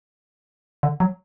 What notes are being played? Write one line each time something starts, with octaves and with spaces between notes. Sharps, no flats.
D3
F#3